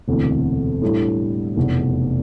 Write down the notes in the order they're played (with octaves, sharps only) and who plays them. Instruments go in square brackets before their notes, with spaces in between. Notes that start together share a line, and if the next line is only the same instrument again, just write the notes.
[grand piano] E1 D2 C3 E3
A2 G3 D4
F1 E2 B2